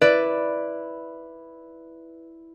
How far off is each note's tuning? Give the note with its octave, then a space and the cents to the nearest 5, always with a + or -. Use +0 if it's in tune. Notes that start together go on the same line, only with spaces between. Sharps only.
E4 +0 B4 +0 D5 +0